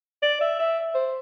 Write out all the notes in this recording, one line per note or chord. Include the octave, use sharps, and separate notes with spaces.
D5
E5
E5
C5